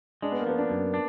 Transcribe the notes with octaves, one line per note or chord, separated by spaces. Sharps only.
G#3 D4
B3
A#3
F3 B3
D4
F#2
D4